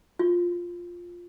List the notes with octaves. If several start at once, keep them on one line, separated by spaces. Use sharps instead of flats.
F4